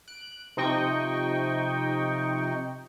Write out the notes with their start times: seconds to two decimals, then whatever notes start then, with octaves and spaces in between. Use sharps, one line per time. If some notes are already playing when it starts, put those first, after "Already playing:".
0.08 F#6 D7
0.57 C3 F3 D#4 D#5 G5 C#6